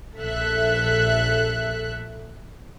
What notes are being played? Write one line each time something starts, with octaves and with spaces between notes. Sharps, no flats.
A#1 A4 E5 F#6